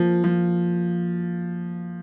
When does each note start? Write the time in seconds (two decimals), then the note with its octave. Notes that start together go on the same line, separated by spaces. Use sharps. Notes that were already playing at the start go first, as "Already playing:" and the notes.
Already playing: F3 A#3
0.24 F3